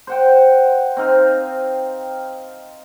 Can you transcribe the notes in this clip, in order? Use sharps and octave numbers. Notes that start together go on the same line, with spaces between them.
C5 F#5 G5
C4 D#4 F5